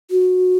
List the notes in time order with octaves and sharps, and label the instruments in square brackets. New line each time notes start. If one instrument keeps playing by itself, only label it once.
[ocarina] F#4